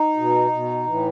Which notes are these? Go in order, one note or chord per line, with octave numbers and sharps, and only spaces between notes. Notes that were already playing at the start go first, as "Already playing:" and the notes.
Already playing: D#4
B2
B2
A2 E3